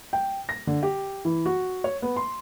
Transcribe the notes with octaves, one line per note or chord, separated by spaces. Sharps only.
G5
A#6
D3
G4
E3
F#4
C#5
B3
C6